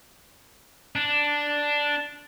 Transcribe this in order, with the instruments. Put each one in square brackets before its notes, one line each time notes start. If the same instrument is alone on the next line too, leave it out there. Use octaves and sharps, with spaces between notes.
[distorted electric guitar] D4